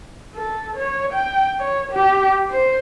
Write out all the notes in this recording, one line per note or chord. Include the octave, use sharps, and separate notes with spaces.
A4
C#5
G5
C#5
G4
C5